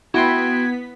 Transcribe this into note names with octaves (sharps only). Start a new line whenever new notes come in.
B3 E4 F#4 G5 C6 G#6 B6